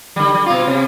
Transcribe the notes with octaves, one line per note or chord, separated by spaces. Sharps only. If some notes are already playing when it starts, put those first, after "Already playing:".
D3 G3
G3
B2 F4
C3